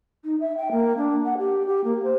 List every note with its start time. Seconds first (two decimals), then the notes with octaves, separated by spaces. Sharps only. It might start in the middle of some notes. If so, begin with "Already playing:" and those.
0.24 D#4
0.40 E5
0.57 G5
0.72 A#3
0.98 D4
1.25 F#5
1.38 G4
1.67 G4
1.85 A#3
2.04 C5